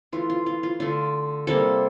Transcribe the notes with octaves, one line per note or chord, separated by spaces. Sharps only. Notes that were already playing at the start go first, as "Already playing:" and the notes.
E3 A3 F4
F4
F4
F4
D3 A3 F4
C3 G3 A#3 A4